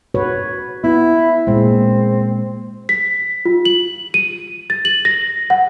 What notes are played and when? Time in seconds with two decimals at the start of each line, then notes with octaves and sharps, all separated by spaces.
0.14 F#4 B4 C#5
0.84 B3 E4
1.47 A#2 G#3 C4
2.89 B6
3.45 F4
3.65 F#7
4.14 D#7
4.70 A6
4.85 F#7
5.05 A#6
5.50 F#5